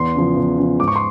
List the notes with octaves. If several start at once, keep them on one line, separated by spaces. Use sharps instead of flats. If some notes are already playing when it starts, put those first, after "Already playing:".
Already playing: E2 C6
C#3 F3
E2
C#3 F3
G#2 D6
C#6
C6